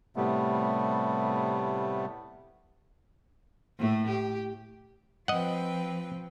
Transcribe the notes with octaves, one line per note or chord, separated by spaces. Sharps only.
A2 C3 G3 A3 B3
A2 A3
G4
F3 C4 B4 D#5 F#5 G5